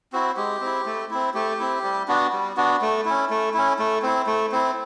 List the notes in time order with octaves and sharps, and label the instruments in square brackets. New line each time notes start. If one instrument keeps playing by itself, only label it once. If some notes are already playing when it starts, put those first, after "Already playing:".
[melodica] C4 E4 F#4
G#3 G4
C4 E4
A3
C4 E4
A3 G4
C4 E4
G3
B3 D4 F#4
G3
B3 D4 F#4
A3
C#4 E4
A3
C#4 E4
A3
C4 E4
A3
C4 E4